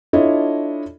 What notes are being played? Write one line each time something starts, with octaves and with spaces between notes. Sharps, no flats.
D4 E4 F4 A4 C#5 D#5